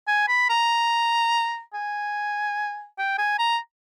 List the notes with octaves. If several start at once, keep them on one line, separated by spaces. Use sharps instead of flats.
G#5
B5
A#5
G#5
G5
G#5
A#5